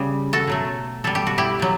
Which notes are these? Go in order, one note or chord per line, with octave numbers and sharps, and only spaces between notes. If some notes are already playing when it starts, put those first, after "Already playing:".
Already playing: C#3 G3
F#4 A4
B2 F#3 A3
B2 G3 A4
G4
F#4
E4 G4
B2 F#3